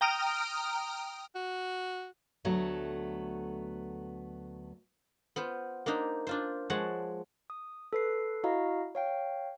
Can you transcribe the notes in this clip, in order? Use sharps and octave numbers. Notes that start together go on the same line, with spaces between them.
G5 A#5 D#6 F6 D7
F#4
D2 F#3 A3 B3
B3 F4 C5
A#3 D4 D#4 C5
D4 F4 C5
F3 G#3 C#5 F#5 A5
D#6
A4 B4 C7
E4 F#4 D#5 F5 A#5
C#5 F5 G5